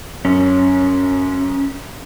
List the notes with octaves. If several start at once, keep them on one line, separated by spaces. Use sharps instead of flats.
F#2 C#4